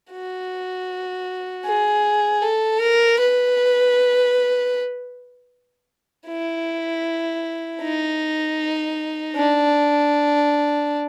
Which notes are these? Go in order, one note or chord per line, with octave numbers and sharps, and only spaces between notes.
F#4
G#4
A4
A#4
B4
E4
D#4
D4